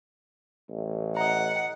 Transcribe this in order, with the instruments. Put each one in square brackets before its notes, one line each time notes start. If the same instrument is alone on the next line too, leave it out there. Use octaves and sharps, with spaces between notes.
[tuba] A1
[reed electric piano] D#5 A#5 [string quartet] F#5